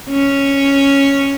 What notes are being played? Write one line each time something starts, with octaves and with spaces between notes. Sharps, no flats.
C#4